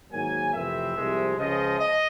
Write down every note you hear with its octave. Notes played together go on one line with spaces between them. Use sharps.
G#2 D#3 F#3 A#3 G#5
F2 C3 E3 A3 C4 E5
C2 C3 F3 G#3
C#2 C#3 F3 D#5
D#5